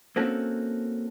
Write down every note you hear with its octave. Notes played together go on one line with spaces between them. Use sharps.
A#3 C4 C#4 D#4 F#4 A4